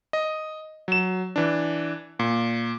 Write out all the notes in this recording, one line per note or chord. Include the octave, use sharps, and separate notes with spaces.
D#5
F#3 E7
E3 D4
A#2